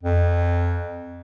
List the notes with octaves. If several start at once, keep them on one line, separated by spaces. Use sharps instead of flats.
F2